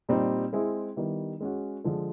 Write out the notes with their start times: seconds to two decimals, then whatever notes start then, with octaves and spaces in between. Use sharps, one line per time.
0.09 A#2 G3 C4 D#4
0.53 G#3 C4 E4 G#4
0.96 D#3 G3 B3 E4
1.40 G#3 C#4 F#4
1.84 D3 F3 G#3